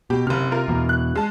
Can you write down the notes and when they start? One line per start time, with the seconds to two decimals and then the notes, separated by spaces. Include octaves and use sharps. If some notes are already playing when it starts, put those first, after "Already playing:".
0.10 B2 G4
0.27 F#1 C3 F6
0.51 F4 A#4
0.68 E2 B2
0.89 F#6
1.15 G#3 A5